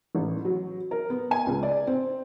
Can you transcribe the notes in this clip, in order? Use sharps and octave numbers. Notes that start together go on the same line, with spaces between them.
A1
F#3
A#4
B3
G#5
C#2
D5
C4